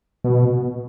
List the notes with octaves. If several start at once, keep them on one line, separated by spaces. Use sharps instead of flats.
B2